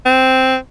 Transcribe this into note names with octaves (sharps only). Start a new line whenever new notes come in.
C4